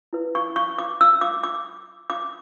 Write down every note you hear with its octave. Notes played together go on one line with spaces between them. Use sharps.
E4 B4
C#6
C#6
D6
E6
D6
D6
D6